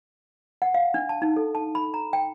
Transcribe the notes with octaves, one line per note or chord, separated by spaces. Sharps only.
F#5
F5
D4
A5
D#4
A4
A5
B5
A#5
G5